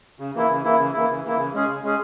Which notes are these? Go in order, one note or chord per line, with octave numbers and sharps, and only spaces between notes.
C#3
E3 A#3 E4
C#3
E3 A#3 E4
C#3
E3 A#3 E4
C#3
E3 A#3 E4
C#3
G#3 C#4 G#4
C#3
G#3 C#4 G#4